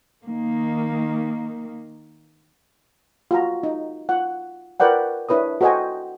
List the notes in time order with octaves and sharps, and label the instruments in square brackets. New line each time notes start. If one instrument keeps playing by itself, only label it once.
[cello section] D#3 A#3
[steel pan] F4 F#4 A5 A#5
D#4
F4 F#5
F4 A#4 B4 D5 F#5 G5
D4 E4 B4 C#5 D#6
F#4 A4 C5 D#5 G5 G#5